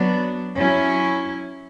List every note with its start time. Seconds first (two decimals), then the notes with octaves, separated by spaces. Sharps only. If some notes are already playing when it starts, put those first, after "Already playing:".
Already playing: F#3 B3 D4
0.58 F#3 C#4 E4